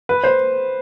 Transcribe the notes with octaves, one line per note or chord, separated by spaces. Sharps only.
B4
C5